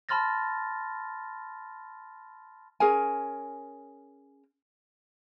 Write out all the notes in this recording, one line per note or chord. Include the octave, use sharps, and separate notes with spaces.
A5 B5 C6 F6 A6 A#6
C#4 G#4 A#4 G#5